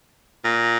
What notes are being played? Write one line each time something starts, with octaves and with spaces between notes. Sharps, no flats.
A#2